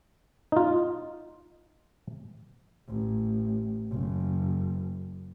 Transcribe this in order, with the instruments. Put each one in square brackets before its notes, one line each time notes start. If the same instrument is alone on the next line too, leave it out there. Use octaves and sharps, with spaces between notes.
[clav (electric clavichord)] D#4 F4
[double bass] A1
F#1